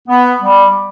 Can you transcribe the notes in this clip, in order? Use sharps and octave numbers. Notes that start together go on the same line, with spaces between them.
B3
G3